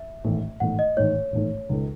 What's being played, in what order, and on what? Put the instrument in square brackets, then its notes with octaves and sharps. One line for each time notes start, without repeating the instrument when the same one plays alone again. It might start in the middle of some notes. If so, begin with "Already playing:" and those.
Already playing: [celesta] E5
[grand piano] A1 G#2 D#3 A3
[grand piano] A1 G#2 D#3 A3 [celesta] F#5
[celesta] D#5
[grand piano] A1 G#2 D#3 A3 [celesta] C#5
[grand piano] A1 G#2 D#3 A3
C#2 C#3 G#3 D#4 A4